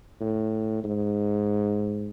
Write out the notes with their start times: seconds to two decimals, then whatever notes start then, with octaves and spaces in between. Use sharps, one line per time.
0.21 A2
0.84 G#2